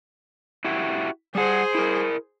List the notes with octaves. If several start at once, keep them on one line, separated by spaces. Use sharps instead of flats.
E4 F#4 G4
G3 G#4 C5 F#5
E4 A#4